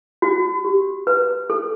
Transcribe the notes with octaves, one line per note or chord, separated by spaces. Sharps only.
F#4
G4
B4
A4